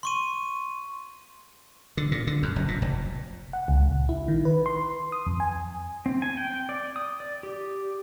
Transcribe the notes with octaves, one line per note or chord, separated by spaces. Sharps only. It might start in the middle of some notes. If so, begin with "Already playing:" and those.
C6 C#6 D#7
D3
A#2
D3
F#2
F#1
A#2
F1
F#5
C#2
A#1
E4
D#3
B4
C6
D#6
F2
G#5
C4
G#5
G5
D5
D#6
D5
G4